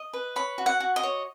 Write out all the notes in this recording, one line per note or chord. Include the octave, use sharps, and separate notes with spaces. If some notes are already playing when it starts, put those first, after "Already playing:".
Already playing: D#5
B4
C#5 B5
F#4
F#5
F#4
D#5
C#5